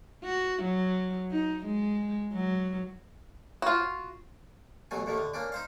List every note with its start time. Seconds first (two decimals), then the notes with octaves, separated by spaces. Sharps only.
0.24 F#4
0.62 F#3
1.31 D#4
1.66 G#3
2.33 F#3
3.62 F4 F#4
4.91 A1 B2 F#3 A3 G#5
5.06 D#2 A2 D3 D#3 A3
5.18 D3
5.34 A#3 C#4 D4 G4
5.52 D#4 C5 F5